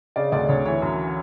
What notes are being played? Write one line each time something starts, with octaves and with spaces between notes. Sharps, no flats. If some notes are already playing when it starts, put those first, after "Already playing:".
C#3 D5
D2 D5
D2 C#5
E3 C#5
F#2